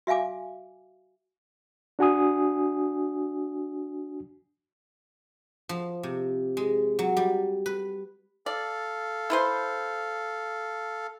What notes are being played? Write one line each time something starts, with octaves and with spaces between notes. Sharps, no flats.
F#4 E5 F5 G#5 D6
D4 F#4 G#5 D#6
F3
C3
G#3
F#3
G3
B4
A4 D5 F5
E4 B4 C5